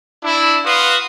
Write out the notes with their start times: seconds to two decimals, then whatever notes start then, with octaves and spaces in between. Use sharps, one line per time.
0.23 D4 E4
0.65 F#4 B4 F5 C6 D#6